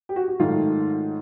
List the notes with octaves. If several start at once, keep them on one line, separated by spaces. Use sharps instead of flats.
G4
F#4
F#4
G#2 D#3 F#3 A3 F4